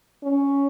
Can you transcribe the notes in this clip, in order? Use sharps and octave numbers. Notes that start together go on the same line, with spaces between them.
C#4